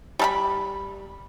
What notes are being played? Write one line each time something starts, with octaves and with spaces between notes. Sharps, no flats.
G3 A4 B5